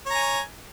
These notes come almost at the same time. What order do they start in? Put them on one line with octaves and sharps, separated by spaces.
C#5 A#5 G#5